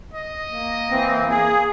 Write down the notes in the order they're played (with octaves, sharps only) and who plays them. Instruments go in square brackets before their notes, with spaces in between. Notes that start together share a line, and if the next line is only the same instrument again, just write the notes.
[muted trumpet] D#5
[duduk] A#3
[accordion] E3 C4
G#4